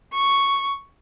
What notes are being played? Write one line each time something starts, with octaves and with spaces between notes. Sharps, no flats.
C#6